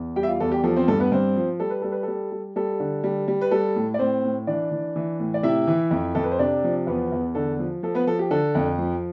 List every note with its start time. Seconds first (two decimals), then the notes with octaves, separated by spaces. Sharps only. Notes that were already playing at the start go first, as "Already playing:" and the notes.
Already playing: E2
0.16 G3 G4 G5
0.23 E5
0.28 F4 F5
0.40 E2 A4
0.51 G4
0.64 F3 A4
0.76 C4 C5
0.88 G2 A4
1.00 B3 B4
1.11 G2 C4 C5
1.36 F3
1.60 G3 A4
1.70 B4
1.82 G3 A4
1.92 B4
2.03 G3 A4
2.32 G3
2.56 G3 A4
2.80 D3
3.04 G3
3.28 G3
3.41 B4
3.51 G3 A4
3.76 A2
3.94 D5
3.99 A2 C4 C5
4.24 A2
4.47 E3 D4 D5
4.71 E3
4.96 E3
5.20 A2
5.34 D5
5.43 C3 E4 E5
5.67 E3
5.91 F2
6.15 F2 A4
6.24 B4
6.31 C5
6.39 C3 D4 D5
6.64 F3
6.87 E2 B3 B4
7.12 E2
7.35 D3 A4
7.59 F3
7.83 F3 A4
7.95 B3 B4
8.07 F3 A4
8.19 G4
8.31 D3 A4
8.55 F2
8.78 F3